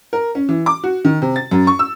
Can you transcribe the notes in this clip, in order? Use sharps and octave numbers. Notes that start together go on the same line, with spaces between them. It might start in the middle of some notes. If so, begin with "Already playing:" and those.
A#4
C#4
E3
D6
F#4
D#3
C3
A6
F#2
C#6
E6